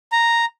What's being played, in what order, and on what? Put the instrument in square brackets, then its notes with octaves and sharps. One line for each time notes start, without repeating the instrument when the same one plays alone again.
[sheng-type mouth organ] A#5